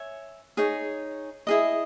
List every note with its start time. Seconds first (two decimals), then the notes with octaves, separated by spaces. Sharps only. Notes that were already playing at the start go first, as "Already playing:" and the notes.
Already playing: C#5 E5 G#5
0.57 D#4 G#4 C#5
1.47 E4 G#4 D#5